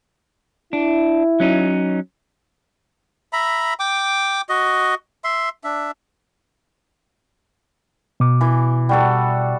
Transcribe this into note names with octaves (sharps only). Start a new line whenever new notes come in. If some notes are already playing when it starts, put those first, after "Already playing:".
D4 E4
F#3 C#4 D#4
E5 A#5 B5
G5 D6
F#4 D#5
E5 C6
D4 E5
B2 D6
E3
G3 F#4 A4